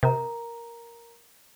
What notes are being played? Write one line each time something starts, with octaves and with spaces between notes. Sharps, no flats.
C3 A#4 A#5